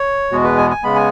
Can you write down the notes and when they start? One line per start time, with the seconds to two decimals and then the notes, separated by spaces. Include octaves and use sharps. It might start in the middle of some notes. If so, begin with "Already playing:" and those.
Already playing: C#5
0.32 E2 B2 G#3 B3 F#4
0.44 B4
0.58 G#5
0.71 G#5
0.83 C#3 G#3 B3 B5
0.96 G#5